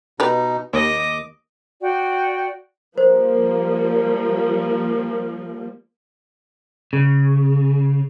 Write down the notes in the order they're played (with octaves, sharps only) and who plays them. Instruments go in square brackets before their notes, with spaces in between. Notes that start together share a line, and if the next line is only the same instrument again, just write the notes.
[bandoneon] B2 D#4 [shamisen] G4 B4 D5
[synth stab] D#2 [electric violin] D#5 [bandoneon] D6
[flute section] F#4 D5 G5
[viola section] F3 G3 A#3 [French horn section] A#4 [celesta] C5
[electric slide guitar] C#3